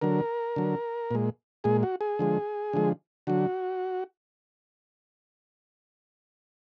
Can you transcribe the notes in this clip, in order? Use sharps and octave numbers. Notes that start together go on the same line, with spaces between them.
D3 F#3 A#4
D3 F#3
A#2 G#3
A#2 G#3 G#4
F#4
G#4
D3 F3 G#3
D3 F3 G#3
D3 F#3 F#4